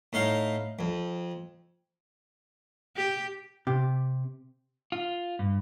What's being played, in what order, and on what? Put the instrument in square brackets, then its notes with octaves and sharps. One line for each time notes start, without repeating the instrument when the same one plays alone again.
[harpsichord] A2 D#4 F5
F2
[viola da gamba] G4
[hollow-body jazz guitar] C3 G4
[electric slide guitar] F4
G2